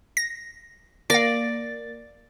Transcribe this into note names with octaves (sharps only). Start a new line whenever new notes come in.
A#6
A#3 D5 F5 A6 A#6